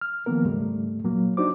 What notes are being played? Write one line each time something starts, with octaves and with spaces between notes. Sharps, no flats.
F6
D#3 F3 A#3 B3 A#4
D#2 G#2 C#3 G3 A3
A#2 F#3 A#3
D4 D#4 F#4 C5 D6